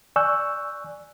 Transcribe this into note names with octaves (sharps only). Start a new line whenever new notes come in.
D5 G#5 C#6 E6 F#6 G6